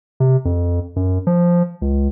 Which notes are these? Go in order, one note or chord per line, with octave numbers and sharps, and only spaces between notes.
C3
F2
F#2
F3
C#2